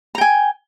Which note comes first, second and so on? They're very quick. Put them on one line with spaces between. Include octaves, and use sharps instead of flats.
A#5 G5 G#5